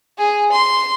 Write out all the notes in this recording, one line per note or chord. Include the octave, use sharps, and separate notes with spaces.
G#4
C6